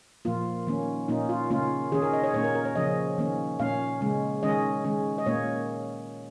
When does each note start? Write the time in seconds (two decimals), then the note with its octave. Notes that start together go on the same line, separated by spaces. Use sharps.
0.25 A#2 F3 A#3 F4
0.67 D#3 A#3 C#4
1.08 A#2 A#3 C#4 D#4
1.29 F4
1.50 C#3 A#3 C#4 F4
1.92 D#3 C#4 G#4
2.02 A#4
2.13 D#5
2.24 C#5
2.34 A#2 A#3 C#4 C#5
2.44 A#4
2.55 A#4
2.65 C#5
2.75 C#3 F3 C#4 D#5
3.18 D#3 A#3 C#4
3.59 A#2 A#3 C#4 F5
4.01 C#3 G#3 C#4
4.43 D#3 G#3 C#4 D#5
4.85 D#3 G#3 C#4
5.18 D#5
5.26 A#2 A#3 C#4 C#5